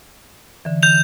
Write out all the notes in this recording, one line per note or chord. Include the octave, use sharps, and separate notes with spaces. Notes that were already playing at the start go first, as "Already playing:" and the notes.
D3 E3
G6 F7